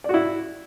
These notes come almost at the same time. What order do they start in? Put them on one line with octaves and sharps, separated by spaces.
D5 F#4 E4